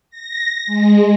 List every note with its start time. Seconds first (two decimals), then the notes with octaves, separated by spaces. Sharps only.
0.10 A#6
0.67 G#3